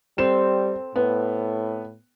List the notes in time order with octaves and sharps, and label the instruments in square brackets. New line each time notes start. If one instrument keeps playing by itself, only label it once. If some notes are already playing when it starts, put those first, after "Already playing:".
[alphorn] G3 [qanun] C4 A4 C5 [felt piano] E7
[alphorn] A2 [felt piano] B3